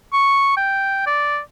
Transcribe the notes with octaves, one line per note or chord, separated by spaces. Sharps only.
C#6
G5
D5